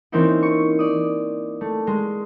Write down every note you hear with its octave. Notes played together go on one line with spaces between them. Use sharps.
E3 A#3 C4 C#4 D#4 E4
C#6
D5 D#6
A3
G#3